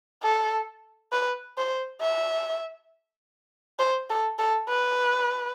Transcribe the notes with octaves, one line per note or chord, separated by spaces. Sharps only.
A4
B4
C5
E5
C5
A4
A4
B4